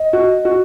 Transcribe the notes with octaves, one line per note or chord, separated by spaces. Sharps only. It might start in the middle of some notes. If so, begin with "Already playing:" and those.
Already playing: D#5
F#4
F#4